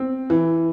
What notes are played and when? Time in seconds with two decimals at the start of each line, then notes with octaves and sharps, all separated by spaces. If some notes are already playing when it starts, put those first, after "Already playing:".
Already playing: C4
0.30 E3